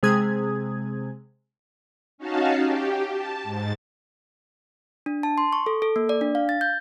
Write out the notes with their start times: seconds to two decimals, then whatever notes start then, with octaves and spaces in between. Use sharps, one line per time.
0.03 C3 G#3 C4 G#4 D#6 G#6
2.18 C#4 D#4 F#4 F5 A5
2.62 G4
3.12 A5
3.43 G#2 A6
5.06 D4
5.23 A5
5.38 C6
5.53 C#6
5.66 A4
5.82 A4
5.96 A#3
6.09 D5
6.21 D4
6.35 F5
6.49 A6
6.61 G6